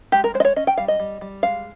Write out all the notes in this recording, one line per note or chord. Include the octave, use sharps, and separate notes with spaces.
G#3 G4
A#4
G#3 C5
D#5
C#5
C#4 D#5
G5
G3 F5
D#5
G3
G3
G#3 F5